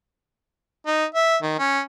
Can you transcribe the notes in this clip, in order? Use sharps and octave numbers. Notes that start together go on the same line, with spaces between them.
D#4
E5
D#3
C#4